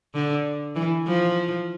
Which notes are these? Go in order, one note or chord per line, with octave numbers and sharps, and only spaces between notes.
D3
E3
F3